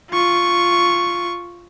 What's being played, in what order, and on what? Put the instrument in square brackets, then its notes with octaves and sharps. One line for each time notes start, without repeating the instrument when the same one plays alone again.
[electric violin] F4 C#6